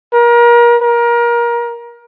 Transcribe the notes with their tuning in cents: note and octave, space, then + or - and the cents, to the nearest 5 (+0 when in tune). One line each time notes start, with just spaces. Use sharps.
A#4 +30
A#4 +25